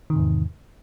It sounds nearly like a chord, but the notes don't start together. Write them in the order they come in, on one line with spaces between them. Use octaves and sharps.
D#3 C3 G#2 E2